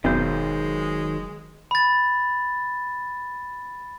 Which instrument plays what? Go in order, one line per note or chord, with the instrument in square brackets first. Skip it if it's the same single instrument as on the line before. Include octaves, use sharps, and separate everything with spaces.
[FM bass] F1 [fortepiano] B1 B2 [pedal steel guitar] D#3 F#3 C5 [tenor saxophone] G#3
[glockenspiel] B5 A6